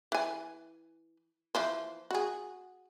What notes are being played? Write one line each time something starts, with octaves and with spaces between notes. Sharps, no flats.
E3 G#5
E3 F3 C5
F#4 G#4